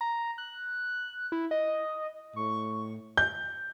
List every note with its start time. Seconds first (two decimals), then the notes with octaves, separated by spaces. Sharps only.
0.01 A#5
0.38 F#6
1.32 E4
1.51 D#5
2.36 A2 C#6
3.17 G6